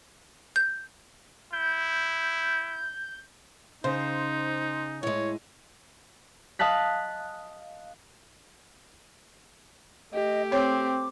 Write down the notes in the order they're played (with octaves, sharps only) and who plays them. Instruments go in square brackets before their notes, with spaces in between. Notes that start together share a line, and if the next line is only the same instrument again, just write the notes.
[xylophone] G6
[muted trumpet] E4 [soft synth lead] G6
[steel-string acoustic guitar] C#3 [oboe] D#4 [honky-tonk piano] C5
[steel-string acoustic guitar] A2 G#3 [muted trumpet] C#5
[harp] D#5 F5 A5 F#6 B6
[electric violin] A3 G4 [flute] D#5
[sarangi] C4 [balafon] C#5 [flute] D6